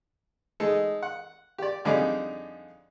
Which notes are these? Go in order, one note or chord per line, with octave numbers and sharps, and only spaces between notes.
G#3 D#4 A4
F#5
G4 D5
F2 D3 G3 D#4 G#4 D6